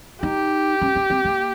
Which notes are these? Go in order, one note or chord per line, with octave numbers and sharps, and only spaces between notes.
D#4 G4
C#4
C#4
C4
A#3